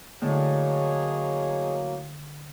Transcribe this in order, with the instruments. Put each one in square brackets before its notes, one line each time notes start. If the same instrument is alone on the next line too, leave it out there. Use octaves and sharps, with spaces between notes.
[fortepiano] A2 [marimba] D3 [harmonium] F#3 A#3 [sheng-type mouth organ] G#4 C#5 D#5